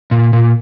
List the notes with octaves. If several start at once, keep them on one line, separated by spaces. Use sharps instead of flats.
A#2
A#2